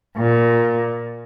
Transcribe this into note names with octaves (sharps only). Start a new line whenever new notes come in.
A#2